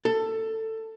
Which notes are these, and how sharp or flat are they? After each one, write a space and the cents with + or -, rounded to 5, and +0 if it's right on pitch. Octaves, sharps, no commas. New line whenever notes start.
A4 +15